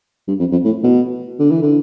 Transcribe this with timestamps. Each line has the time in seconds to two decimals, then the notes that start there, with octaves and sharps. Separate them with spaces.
0.28 G2
0.40 F2
0.52 F2
0.65 A2
0.83 B2
1.39 D3
1.51 E3
1.62 D3